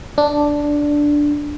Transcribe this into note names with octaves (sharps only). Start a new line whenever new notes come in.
D4